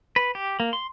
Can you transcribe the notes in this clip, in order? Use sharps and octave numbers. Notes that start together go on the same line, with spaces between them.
B4
G4
A#3
C6